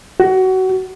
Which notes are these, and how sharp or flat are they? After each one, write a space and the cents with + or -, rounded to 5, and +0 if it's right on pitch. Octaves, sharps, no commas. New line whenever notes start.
F#4 +25